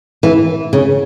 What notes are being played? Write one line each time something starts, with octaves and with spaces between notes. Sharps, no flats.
E3
C#3